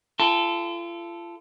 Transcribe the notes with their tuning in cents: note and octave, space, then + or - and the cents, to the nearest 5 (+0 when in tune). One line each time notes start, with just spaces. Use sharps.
F4 -40 A4 +0 G5 +45